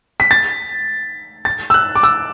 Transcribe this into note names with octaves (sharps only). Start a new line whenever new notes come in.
B6
A6
A6
E6
F#6
D6
E6